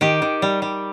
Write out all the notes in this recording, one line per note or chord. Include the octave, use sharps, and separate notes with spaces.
D#3 G4
D#3
G3
G3